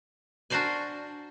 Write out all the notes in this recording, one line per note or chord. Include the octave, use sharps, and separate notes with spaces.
D4 F#4 A#4 C5 D5 G#5